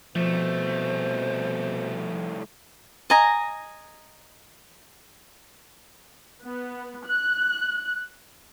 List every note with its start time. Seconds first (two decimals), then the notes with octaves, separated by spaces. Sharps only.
0.16 C2 B2 F3 A3 C5
3.10 D#5 G#5 A#5
6.44 B3
7.07 F#6